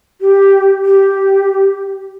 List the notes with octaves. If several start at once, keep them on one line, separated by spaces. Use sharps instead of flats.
G4
G4